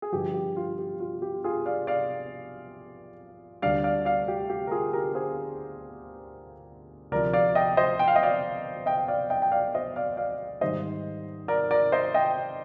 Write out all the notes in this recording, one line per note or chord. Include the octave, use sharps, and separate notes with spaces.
G#4
G2 D3 F3 G4
G4
F4
G4
F4
G4
F4 G#4
D5 F5
D5 F5
D2 D3 G3 D5 F5
D5 F5
D5 F5
G4
G4
A#4
F4 G#4
G4 A#4
G#4 C5
D2 C3 F3 A#4 D5
D5 F5
D#5 G5
C5 D#5
G5
F5
D#5
D5 F5
D#5 G5
D5 F5
D#5 G5
G5
D5 F5
C5 D#5
D5 F5
D5 F5
G#2 D#3 G3 C5 D#5
A#4 D5
A#4 D5
C5 D#5
D#5 G5